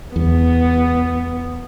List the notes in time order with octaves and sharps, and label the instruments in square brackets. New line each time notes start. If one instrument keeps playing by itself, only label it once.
[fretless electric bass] E2 [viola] B3